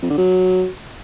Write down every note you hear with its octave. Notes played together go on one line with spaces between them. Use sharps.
F2
D3
F#3